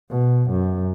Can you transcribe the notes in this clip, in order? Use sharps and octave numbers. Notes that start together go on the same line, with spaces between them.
B2
F#2